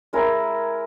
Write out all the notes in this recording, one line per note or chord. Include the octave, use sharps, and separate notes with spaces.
G#3 E4 A#4 G#5